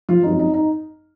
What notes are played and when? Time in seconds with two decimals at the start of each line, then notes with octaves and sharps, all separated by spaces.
0.09 F3 F4
0.23 G#1 F#2 F3 D#4
0.39 D#4
0.54 D#4